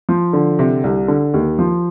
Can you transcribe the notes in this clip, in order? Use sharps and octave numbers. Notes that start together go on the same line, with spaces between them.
F3
D3
C3
C2
D3
D#2
F3